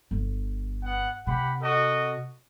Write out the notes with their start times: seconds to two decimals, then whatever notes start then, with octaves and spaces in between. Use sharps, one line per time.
0.11 G1
0.83 B3 F#5
1.27 C3 G4 F#5 B5
1.61 F#4 A4 D#5